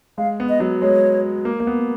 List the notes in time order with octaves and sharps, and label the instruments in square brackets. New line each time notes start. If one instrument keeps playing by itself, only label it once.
[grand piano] G#3 [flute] F5
[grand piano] B3
[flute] D#5
[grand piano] F#3
[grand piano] G#3 [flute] C#5
[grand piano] A#3
A#3
B3